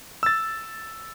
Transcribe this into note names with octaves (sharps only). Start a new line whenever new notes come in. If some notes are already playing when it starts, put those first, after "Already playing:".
E6 A6